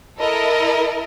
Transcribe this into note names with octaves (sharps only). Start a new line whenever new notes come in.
E4 A4 A#4 D#5